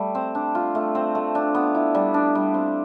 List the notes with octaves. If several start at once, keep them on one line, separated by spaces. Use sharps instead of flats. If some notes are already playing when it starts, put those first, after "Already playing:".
Already playing: G3 A3
C4
D4
F4
A3
C4
A3
D4
B3
E4
G3
D4
G3
C4